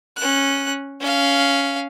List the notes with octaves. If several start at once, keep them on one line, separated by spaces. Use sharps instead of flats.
C#4 F#6
C#4 F5